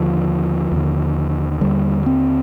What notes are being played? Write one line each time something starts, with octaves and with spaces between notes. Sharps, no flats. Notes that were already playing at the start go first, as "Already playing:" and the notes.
Already playing: D#2 D3 F3
D#2 D3
D#2 D3 G3
C4